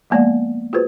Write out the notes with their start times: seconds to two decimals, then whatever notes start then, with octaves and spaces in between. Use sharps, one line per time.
0.10 F3 G#3 A#3 B3 D5 F#5
0.73 F4 F#4 G#4 B4 C5